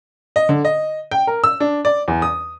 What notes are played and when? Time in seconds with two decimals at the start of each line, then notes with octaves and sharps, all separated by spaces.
0.36 D#5
0.49 D3
0.65 D#5
1.11 G5
1.27 A#4
1.44 E6
1.60 D4
1.85 D5
2.08 E2
2.22 D#6